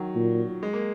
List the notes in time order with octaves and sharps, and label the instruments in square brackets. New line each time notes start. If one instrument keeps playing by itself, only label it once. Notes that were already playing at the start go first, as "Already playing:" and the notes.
Already playing: [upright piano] D#3 F#3
[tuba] A#2
[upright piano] G#3
A#3